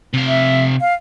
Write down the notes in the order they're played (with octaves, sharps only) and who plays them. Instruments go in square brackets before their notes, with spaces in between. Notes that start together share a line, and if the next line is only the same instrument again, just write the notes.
[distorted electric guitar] C3 F5
[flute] E5
F5